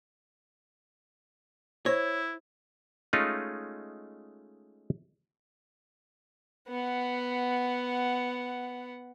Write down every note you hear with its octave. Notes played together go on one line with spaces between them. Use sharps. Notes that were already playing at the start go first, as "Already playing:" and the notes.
E4 C5 C#5
G#3 A3 C#4 D#4 F4
B3 F#5